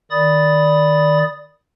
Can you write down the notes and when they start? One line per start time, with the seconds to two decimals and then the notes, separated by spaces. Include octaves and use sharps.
0.11 D#3 D5 B5 D#6 A6